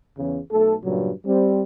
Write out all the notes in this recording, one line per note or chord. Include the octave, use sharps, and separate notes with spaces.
E2 C#3
B1 A3 A4
G2 A#2 C#3 F#3
G3 C4